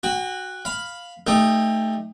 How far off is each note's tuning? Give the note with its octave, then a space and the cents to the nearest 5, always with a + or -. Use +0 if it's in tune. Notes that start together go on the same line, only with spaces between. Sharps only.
F#4 +0 G5 +40
F5 +5 B5 +0
A3 +0 D#4 +0 G4 +25